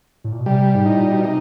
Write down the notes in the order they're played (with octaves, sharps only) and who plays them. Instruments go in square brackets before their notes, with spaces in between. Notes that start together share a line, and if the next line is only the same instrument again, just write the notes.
[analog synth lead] A2
A#2
B2
[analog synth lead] C3 [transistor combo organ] G3
[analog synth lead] G#2
[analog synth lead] A2 [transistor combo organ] D#4
[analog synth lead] A#2
B2
[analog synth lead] C3 [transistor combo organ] D#4